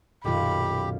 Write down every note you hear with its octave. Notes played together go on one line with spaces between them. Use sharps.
B1 F#2 A#2 D#3 F4 G4 B5